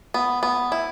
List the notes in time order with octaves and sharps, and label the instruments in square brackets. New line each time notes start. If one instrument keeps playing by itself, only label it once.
[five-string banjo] B3
B3
E4